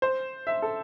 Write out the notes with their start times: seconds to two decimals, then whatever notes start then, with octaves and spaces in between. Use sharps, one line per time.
0.02 C5
0.47 E5
0.62 A4